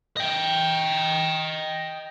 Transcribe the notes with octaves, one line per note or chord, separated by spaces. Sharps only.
D#5 G5